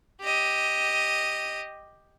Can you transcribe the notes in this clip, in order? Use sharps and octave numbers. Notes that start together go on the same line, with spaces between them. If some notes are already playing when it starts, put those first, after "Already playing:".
G4 D#5